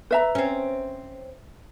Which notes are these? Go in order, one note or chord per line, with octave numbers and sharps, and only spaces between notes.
B4 E5 A#5
C4 C#4